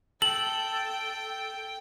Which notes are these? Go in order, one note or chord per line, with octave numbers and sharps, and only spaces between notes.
A4 G5 F#7